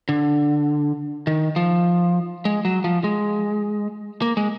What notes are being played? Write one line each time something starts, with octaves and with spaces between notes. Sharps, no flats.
D3
D#3
F3
G#3
F#3
F3
G#3
A#3
G#3